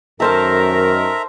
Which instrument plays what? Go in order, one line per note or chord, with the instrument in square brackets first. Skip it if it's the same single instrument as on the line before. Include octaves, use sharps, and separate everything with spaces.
[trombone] F#2 [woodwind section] D#3 A#4 [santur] A4 C5 A5 [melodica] E5 A#5